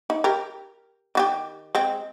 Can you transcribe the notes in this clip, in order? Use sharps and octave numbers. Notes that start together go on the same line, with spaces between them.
D#4
G4 A#4
D#3 F#4 G4
G#3 C4